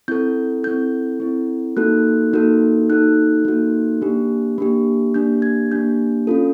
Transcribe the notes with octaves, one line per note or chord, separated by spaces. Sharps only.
C4 E4 A4 G6
C4 E4 A4 G6
C4 E4 A4
A#3 D#4 F#4 A4 F#6
A#3 D#4 F#4 A4
A#3 D#4 F#4 A4 F#6
A#3 D#4 F#4 A4
A#3 D4 G4
A#3 D4 G4
A#3 D4 G4 G6
G#6
A#3 D4 G4 G6
C#4 F4 A4